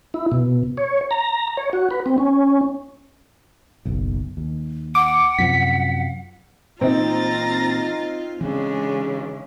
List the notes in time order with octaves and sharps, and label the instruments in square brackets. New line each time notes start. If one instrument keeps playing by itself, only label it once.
[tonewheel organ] E4
B2
C#5
A#5
C#5
F#4
B4
C4
C#4
[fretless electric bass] F#1 B1
D#2
[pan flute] F#5 [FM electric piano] D6
[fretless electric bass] F#2 C3 F3 [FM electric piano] B6
[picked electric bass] A#2 E3 A#3 [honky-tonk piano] C4 D#4 [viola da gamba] F4 [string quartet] A#5 A6
[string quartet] C#3 [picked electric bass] E3 C#4 [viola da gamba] G#3 D4